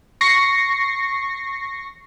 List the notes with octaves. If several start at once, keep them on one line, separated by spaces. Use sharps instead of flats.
C#6 A#6 C7 C#7